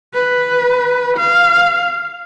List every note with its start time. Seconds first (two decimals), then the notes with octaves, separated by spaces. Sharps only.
0.14 B4
1.17 F5